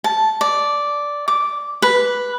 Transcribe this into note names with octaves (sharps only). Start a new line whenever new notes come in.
A5
D5
D6
B4